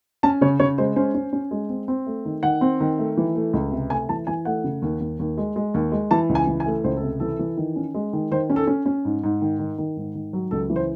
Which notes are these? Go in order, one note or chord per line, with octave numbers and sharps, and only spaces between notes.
C#4 A5
C#3 C#5
C#3 C#5
G#3 C5
C#4 C5
C#4
C#4
G#3
C4
C4
A3
D#3
D#3 F#5
C4
D#3
A3
E3
A3
C#2
C3
A3 G#5
E3 A5
E3 G#5
A3 F#5
C#3
D#2
D#2
D#2
G#3
G#3
D#2
G#3
E3 A5
C#2
G#5
E3
G#5
A3
C#2 C5
A4
C3
E3 A4
E3
D#3
C#4
G#3
D#3
D#3 C5
C#4
A4
C#4
C#4
G#2
G#2
D#3
D#3
D#3
G#2
D#3
F#3
C#2 A4
E3
C5